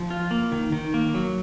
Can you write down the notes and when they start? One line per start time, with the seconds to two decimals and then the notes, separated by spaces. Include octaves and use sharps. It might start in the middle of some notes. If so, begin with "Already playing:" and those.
Already playing: F3
0.10 F4
0.31 A#3
0.52 D#3
0.72 D#3
0.94 A#3
1.14 F#3